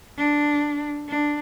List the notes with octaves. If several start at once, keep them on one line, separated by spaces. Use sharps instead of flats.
D4
D4